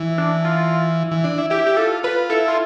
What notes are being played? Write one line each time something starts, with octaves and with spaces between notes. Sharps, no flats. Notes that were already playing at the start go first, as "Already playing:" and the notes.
Already playing: E3
D4
F4
E3
D4
E4
E4 G4
G4
F4 A4
F4 B4
E4 A4
F4